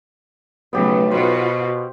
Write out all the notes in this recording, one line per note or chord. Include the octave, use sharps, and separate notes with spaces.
B1 C#3 F#3 A3 B3 G4
B2 F4 F#4 B4 C5